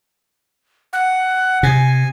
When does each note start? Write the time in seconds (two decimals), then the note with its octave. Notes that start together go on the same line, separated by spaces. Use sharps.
0.93 F#5
1.63 C3 G#5